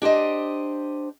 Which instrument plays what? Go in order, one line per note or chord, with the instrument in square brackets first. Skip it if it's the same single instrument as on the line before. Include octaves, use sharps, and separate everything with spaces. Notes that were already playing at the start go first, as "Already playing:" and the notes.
[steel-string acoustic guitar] D4 G4 C5 D#5